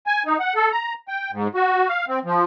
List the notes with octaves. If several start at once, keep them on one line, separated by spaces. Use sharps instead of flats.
G#5
D#4
F#5
A4
A#5
G5
G#2
F#4
F5
C4
F3